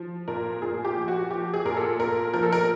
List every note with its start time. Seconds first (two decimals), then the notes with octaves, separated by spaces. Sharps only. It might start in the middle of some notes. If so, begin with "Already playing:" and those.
Already playing: F3
0.28 A#2 A#4
0.62 A#2 G#4
0.85 G4
0.97 F3
1.08 F#4
1.31 F3 G4
1.54 G#4
1.65 A#2 A#4
1.77 A4
1.99 A#2 A#4
2.33 F3 A#4
2.43 A4
2.53 A#4